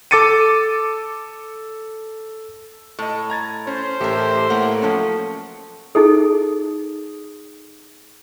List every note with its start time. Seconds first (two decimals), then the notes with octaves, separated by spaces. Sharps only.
0.11 A4 D6 A6 C#7 D#7
2.99 A2 A4 D#5
3.30 A#5 G#6 A6
3.67 C#4 C5
4.01 A1 A3 G4 A4 A#4
4.50 A2 A3 A#3 E4 A#4 F#5
4.82 F3 F#3 C#4 A4
5.95 D#4 G#4 A4